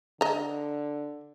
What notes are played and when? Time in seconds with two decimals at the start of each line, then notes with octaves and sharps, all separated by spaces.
0.21 D3 D#5 A#5